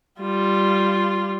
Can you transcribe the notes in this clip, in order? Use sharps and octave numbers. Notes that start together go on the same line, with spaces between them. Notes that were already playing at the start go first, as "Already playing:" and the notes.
G3 F4